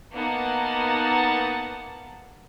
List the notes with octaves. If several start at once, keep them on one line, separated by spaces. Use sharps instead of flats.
A#3 B3 D#4 F#5 A5